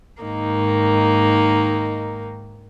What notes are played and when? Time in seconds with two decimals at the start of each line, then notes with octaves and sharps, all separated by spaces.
0.22 G#2 D#3 A#3 D#4